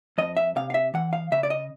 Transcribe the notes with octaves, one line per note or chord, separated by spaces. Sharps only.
F2 D#5
E5
C3 F5
F5
E5
E3 F#5
F5
C#3 E5
D5
D#5